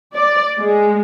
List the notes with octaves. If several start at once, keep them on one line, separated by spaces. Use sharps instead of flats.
D5
G#3